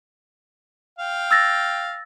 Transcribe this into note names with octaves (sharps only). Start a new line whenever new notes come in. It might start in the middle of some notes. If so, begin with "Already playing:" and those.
F5 G5
E6 A6 A#6